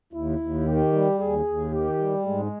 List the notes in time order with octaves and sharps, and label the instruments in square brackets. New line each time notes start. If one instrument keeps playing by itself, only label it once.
[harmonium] D#2 [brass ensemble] E4
[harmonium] D#2
[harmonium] D#3 [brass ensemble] G4
[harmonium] G3
[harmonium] D#2 [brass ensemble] G#4
[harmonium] D#2
[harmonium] D#3 [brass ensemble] G4
[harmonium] G3
[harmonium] G#2 [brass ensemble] G#3